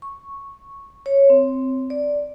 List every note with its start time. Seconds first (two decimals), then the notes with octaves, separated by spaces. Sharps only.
0.02 C#6
1.06 C#5
1.30 C4
1.90 D5